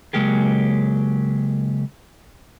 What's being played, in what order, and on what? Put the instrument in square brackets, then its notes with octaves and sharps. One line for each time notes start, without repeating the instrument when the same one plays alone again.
[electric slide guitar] C#3 F#3 G#3 A#3 G4 G#4